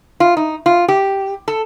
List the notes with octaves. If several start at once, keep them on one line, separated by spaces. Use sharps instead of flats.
F4
D#4
F4
G4
A4